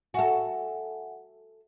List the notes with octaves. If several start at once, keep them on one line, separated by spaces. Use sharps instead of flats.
F#4 A4 E5 F#5 G#5